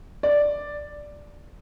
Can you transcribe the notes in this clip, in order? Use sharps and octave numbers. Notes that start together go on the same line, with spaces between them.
D5